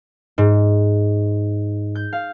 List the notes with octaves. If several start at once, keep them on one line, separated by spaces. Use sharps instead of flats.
G#2
G6
F5